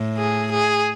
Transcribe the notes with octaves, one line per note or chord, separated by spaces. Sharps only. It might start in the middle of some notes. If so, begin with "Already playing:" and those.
Already playing: A2
G#4
G#4